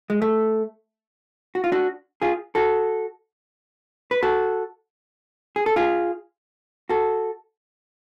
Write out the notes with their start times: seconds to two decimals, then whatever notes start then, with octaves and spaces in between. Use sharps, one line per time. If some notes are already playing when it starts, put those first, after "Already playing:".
0.10 G#3
0.22 A3
1.55 F#4
1.64 F4
1.72 D4 F#4
2.22 F4 G#4
2.55 F#4 A4
4.11 B4
4.23 F#4 A4
5.56 G#4
5.66 A4
5.76 F4 G#4
6.89 F#4 A4